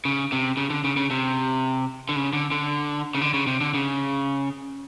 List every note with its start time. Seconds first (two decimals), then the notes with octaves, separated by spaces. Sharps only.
0.05 C#3
0.32 C3
0.57 C#3
0.70 D3
0.85 C#3
0.97 C#3
1.11 C3
2.09 D3
2.16 C#3
2.33 D3
2.51 D3
3.15 C#3
3.21 D3
3.34 C#3
3.47 C3
3.61 D3
3.74 C#3